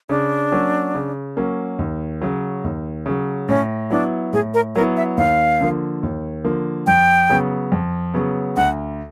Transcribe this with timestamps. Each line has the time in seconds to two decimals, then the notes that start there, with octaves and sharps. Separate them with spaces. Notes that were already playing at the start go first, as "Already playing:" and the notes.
0.09 C#3 D4
0.52 F#3 A#3 C#4
0.95 C#3
1.37 F#3 A#3 C#4
1.79 D#2
2.22 C#3 F#3
2.64 D#2
3.06 C#3 F#3
3.48 A2 C#4
3.90 F#3 B3 D4 E4
4.33 A2 G#4
4.54 A#4
4.75 F#3 B3 E4 A#4
4.97 E5
5.17 D#2 F5
5.61 D3 F3 A#3
6.03 D#2
6.44 D3 F3 A#3
6.87 F2 G5
7.29 C#3 F#3 B3
7.72 F2
8.14 C#3 F#3 B3
8.56 D2 F#5